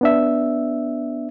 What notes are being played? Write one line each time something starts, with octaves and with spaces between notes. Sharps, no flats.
B3 D4 E5